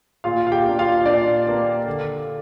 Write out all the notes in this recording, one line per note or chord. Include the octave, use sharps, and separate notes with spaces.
A#2 F4 F5
F5
G4 G5
A#3 D4
F4 F5
A#2 D4 D5
A#3 D4
D3